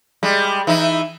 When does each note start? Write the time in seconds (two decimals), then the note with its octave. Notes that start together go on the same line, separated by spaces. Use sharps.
0.23 G3 G#3
0.67 E3 D#4 E4